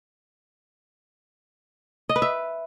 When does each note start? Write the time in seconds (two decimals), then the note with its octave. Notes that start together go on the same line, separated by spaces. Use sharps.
2.09 D#5
2.16 B4
2.22 E5